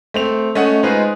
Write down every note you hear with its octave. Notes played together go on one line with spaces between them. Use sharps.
A3 C4 F7
A3 C#4 D#5 F#5
G#3 D#4 F4 G#4 B4 C5